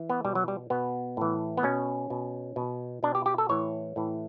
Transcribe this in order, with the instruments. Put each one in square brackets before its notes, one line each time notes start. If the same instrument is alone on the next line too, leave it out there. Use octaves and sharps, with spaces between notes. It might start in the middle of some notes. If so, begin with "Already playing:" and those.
Already playing: [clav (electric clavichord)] E3
B3
B2 G3
F#3
G3
B2 B3
A2 E3
B3
B2 C#4
B2
B2
B2 D4
G4
G4
A4
A2 E3 C#5
A2 E3